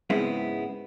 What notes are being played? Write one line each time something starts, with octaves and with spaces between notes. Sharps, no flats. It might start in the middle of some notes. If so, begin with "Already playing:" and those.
G#2 C#3 G#3 B3 C4 E4